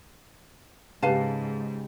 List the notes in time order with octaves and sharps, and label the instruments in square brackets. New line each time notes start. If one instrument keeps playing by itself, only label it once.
[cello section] G#2 [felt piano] C#3 G4 [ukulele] B4 F5 A5